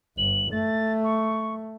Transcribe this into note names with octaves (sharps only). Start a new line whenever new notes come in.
G1 F#7
A3 A6
C#6